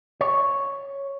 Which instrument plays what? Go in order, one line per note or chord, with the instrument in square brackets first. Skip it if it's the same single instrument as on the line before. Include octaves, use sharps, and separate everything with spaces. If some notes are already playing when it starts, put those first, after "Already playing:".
[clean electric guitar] C#5